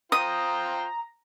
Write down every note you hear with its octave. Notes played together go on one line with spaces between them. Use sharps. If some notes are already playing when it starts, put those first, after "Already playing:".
F4 C5 G5 A#5 D#6